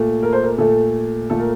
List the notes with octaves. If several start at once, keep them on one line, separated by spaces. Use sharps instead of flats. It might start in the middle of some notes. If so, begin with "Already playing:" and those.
Already playing: A#2 A3
A#4
C5
A#4
A#2 A3 A4
A#2 A3 A4
A#4